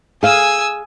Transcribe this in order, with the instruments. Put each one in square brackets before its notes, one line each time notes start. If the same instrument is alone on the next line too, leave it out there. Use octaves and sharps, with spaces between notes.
[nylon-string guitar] G#4 F5 [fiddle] G#5 [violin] D#6 E6